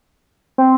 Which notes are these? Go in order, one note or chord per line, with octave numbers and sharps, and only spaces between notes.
C4